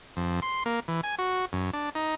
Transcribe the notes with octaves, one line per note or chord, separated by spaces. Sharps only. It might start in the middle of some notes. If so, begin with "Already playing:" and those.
F2
C6
A#3
E3
G#5
F#4
F#2
D4
D#4